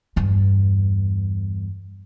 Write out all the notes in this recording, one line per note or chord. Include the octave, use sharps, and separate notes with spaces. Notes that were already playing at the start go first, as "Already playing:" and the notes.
E2 G2